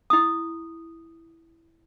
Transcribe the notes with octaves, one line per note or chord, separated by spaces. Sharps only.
E4 D#6